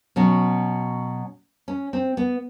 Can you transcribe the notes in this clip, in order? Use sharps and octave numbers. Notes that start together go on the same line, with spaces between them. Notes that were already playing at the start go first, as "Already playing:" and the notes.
B2 F#3 C#4
C#4
C4
B3